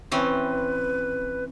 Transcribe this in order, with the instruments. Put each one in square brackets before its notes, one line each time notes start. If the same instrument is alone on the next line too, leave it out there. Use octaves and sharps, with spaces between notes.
[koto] E3 C4 C#4 [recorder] B4